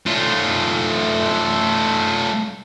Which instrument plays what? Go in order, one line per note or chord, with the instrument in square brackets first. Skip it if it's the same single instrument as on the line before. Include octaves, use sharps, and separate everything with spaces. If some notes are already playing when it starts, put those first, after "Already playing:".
[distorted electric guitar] A3 F4